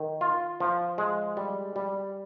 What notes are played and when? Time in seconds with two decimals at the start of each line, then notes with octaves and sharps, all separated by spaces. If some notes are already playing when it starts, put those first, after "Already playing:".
Already playing: D#3
0.21 F4
0.60 F3
0.98 G#3
1.37 G3
1.76 G3